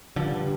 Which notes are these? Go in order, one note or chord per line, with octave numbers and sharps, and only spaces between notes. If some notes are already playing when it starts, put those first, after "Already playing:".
G2 D3 F3